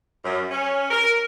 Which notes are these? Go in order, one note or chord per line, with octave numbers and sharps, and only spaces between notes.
F#2
C#4
A#4